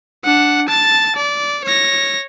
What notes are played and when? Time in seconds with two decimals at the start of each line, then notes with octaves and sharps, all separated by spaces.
0.25 D4 F#5
0.68 A5 A6
1.16 D5
1.64 C#5 A#6